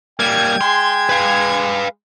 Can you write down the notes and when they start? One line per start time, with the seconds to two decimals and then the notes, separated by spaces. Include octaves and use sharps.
0.20 G3 A#3 G5 G#6
0.61 G#3 C6
1.09 B4 F5